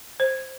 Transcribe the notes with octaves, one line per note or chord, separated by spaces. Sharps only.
C5